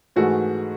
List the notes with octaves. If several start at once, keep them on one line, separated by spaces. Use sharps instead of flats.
G#2 E3 A3 F#4 G#4